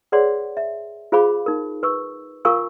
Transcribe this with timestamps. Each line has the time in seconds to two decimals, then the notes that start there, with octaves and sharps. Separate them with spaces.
0.12 G#4 B4 C#5 D5 F#5 C6
0.57 E5
1.12 F4 G#4 C5 F5 B5 D6
1.46 D#4 A#4
1.83 B4 C#6 E6
2.45 F4 A#4 F5 G#5 C#6 E6